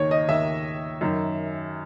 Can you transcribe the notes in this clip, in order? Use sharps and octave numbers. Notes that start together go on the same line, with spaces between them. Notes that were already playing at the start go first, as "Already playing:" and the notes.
Already playing: D#2 D#3 C#5
D#5
D#2 D#3 E5
F#2 D#3